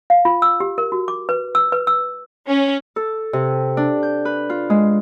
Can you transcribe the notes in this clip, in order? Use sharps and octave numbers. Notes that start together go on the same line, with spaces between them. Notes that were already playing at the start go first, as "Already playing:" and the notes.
F5
F4
E6
G4
A#4
F#4
D6
B4
E6
B4
E6
C#4
A4
C3
D4
G6
B4
F4
G#3